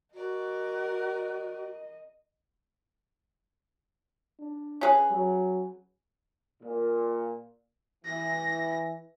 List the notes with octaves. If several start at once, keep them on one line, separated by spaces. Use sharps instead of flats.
F#4 A#4 D5 D#5
D4
C#4 G#4 B4
F#3
A#2
E3 A#6